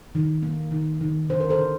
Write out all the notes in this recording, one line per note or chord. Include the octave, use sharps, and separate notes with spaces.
D#3
A#3
D#3
D#3
D3 C5
A#4
A4 C5
D3